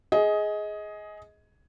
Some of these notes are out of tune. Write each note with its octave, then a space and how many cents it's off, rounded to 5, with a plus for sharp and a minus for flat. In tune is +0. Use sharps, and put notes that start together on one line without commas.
G#4 +10 D#5 +20